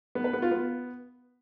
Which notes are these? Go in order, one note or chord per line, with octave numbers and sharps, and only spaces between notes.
B3
B4
B3
F4
B3